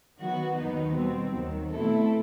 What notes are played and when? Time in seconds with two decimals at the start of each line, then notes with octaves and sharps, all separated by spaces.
0.17 D#3 F#3 B3 F#4
0.56 D#2 D#3 F#3 B3 D#4
0.94 B2 G3 C4
1.32 D#2 D#3 F#3
1.70 B2 A3 C4 E4 A4